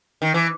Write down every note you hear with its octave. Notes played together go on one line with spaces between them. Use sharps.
D#3
E3